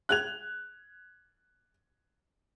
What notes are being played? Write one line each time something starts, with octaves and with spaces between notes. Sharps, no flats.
F#6 G#6 F7